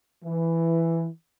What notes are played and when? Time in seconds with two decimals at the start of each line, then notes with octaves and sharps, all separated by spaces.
0.25 E3